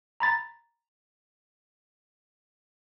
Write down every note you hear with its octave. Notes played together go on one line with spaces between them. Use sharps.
A#5 B5 A6